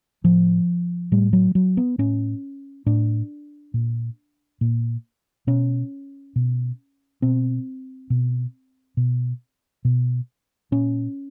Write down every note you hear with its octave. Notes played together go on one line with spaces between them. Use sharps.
A2 F3
A2 G3
F#3
F#3
B3
A2 C#4
A2 D4
A#2
A#2
B2 C#4
B2
B2 C4
B2
B2
B2
A#2 C#4